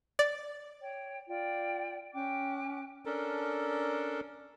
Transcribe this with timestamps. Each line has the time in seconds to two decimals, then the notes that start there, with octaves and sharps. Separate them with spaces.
0.19 D5
0.82 C#5 G5
1.28 F4 D5 G5
2.14 C#4 G5 D6 F#6
3.05 C#4 D4 A4 A#4